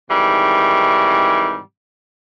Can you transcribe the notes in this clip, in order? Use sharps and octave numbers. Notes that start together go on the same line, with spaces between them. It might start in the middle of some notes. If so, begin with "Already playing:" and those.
G#2 C3 D#3 E3 G3